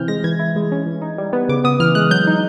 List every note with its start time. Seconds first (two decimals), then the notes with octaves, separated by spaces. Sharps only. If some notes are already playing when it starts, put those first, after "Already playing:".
Already playing: C3 E3 C4 F6 G6
0.08 G#3 A#6
0.24 E3 G#6
0.39 E4
0.56 G#3
0.72 C#4
0.86 E3
1.02 D#4
1.18 G3
1.33 B3
1.49 C#3 D6
1.64 B3 D#6
1.80 E3 F6
1.95 G#3 F#6
2.11 F#3 G6
2.27 D#4